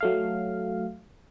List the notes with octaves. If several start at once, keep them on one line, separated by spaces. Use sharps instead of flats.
F#3 A3 F5